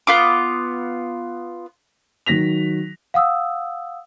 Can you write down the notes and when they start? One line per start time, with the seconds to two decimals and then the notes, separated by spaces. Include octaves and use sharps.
0.07 B3 F4 D6
2.26 D#3 F#3 A#6 B6 F7
3.14 F5 F#5 D#6 E6